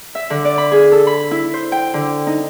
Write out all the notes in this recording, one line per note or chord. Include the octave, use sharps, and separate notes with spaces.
E5
D3
D5
B5
G#4
A4
B5
E4
C5
G5
D3
D#4